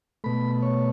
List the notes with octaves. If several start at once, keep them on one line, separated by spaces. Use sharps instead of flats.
B2 A3 B5
C#5